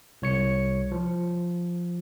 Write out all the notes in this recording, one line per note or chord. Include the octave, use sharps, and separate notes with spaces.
C2 C#5 C#7
F3